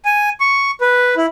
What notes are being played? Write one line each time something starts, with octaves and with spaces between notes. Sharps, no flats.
G#5
C#6
B4
E4